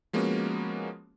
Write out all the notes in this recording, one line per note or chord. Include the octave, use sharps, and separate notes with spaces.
F3 G#3 A#3 B3 C#4 F#4